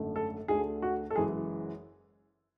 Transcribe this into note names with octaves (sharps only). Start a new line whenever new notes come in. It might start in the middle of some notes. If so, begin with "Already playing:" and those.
Already playing: G#1 F#2 D3 A3
A4
D2 D3 A3 G#4
F#4
A4
F#1 F#2 E3 G#3 G#4